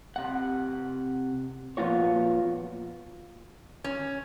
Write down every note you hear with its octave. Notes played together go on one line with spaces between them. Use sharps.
C3 F#5
A#2 F3 B3 F4 F#4 C#5
C#4